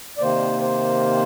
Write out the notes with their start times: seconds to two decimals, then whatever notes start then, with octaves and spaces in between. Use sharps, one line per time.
0.18 D5
0.21 C3 D#3 A#3 C5
0.62 C5